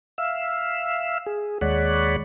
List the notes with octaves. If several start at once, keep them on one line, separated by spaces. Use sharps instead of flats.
E5 F5 E6
G#4
D#2 G#3 C#5 D5 F#5 B5